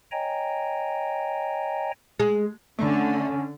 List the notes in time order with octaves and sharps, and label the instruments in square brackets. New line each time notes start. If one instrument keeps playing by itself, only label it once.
[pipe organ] C#5 D#5 G5 G#5 A#5
[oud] G#3
[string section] D3 [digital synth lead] A3 [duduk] C#4